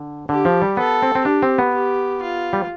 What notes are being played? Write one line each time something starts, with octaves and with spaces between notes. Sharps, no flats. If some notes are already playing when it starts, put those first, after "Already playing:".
Already playing: D3
D3 G4
F3
G3
B3 A4
C4
C4
D4 G4
C4
B3
G4
F4
G3